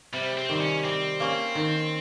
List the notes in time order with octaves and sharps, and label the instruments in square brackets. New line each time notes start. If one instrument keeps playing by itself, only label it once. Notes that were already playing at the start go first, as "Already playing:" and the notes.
[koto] C3 [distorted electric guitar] G3
[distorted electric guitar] C4
[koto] D#3 G3
[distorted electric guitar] C#4
[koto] G3 [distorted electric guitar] C4
[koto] A#3 C#4
D#3